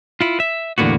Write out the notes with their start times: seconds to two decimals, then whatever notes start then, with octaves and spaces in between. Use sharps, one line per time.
0.21 E4 F4
0.40 E5
0.78 E2 A2 D3 A#3 B3 F#4